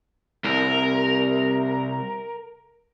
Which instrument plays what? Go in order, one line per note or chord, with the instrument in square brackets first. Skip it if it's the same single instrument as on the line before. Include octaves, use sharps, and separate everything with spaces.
[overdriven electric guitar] C2 [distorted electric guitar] A#4